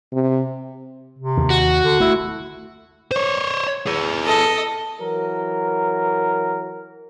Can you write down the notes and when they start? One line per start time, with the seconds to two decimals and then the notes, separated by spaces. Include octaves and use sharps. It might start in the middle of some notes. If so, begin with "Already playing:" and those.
0.12 C3
1.19 C3
1.37 D#2
1.50 F#4
1.82 D3
2.00 A3 E4
3.12 C5 C#5
3.86 G#4 B4
4.25 A4 D#5
5.00 E3 F#3 A#4